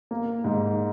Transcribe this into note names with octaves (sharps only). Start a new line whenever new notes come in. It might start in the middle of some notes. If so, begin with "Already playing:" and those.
A#3
G#2